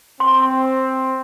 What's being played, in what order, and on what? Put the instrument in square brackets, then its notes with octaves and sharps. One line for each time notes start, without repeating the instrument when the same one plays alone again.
[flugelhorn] C4 [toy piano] C6